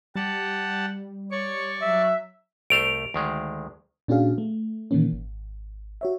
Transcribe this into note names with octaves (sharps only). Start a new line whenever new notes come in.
G3 G4 F#5 A5
C#5 D5 C#6
F#3 E5
C2 A3 C5 D7 F7
D2 D#3 G#3
A#2 C#4 D4 F#4 G#4 F5
A3
A#2 D#3 E3 A#3 C#4
G#1
F#4 C#5 E5